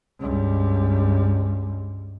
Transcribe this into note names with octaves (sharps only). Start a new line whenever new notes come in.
C#2 G2